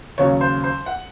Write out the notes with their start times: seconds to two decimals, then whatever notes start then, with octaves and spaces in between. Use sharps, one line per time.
0.18 D#2 C#3 F#3 C#5
0.41 C5
0.64 C5
0.86 F#5